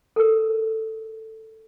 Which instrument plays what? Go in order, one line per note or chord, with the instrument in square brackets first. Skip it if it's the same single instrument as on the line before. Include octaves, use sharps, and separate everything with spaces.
[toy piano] A4 A#4